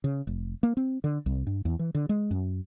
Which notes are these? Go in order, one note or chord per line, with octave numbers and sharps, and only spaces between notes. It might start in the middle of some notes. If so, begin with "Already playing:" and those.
C#3
F1
A#3
C4
D3
C2
G2
E2
E3
D3
G#3
F#2